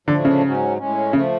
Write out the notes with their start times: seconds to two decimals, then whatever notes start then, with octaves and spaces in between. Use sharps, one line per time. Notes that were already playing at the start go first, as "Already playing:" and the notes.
0.07 A2 D3 F3 A3 D4
0.25 C#3
0.42 G#2 F#3 C#4
0.77 A2 G#3 C#4
1.13 C#3 F3 A3